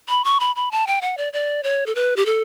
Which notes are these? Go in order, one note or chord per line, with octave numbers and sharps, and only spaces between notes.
B5
C#6
B5
B5
A5
G5
F#5
D5
D5
C#5
A4
B4
G4
A4